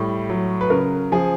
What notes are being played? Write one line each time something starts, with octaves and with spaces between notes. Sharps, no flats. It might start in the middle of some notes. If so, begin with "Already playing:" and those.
Already playing: A2 G3
F#3
B4
C#3 A#4
F3 G#4